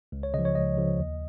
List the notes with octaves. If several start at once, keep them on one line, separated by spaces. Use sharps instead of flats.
C#2
C#5
C#3 F3 D#5
C#5
C#2 D#5
C#3 F3
D#2